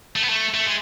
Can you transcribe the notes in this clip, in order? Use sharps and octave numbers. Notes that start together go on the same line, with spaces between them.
A3
B3
A3
A3
G#3